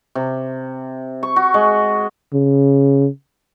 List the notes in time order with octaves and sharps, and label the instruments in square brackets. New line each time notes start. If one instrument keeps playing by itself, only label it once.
[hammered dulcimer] C3
C#6
F#4
G#3
[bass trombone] C#3